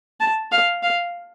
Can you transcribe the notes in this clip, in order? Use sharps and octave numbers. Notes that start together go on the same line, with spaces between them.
A5
F5
F5